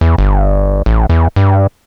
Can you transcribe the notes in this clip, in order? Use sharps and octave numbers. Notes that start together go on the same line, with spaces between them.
E2
G1
A1
E2
G2